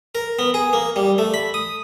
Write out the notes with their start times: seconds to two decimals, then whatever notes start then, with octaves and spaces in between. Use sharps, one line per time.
0.15 A#4
0.39 B3
0.54 G#4
0.73 A#3
0.96 G3
1.18 A3
1.34 B5
1.54 D#6